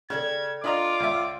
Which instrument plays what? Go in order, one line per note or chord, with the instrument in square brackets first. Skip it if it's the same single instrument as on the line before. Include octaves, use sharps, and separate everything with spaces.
[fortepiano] C#3 [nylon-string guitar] A4 D5 G5 [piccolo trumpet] G#6
[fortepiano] D4 D#5 A#5 [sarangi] F4 [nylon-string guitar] D5 [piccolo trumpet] D6
[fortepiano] C#2 E5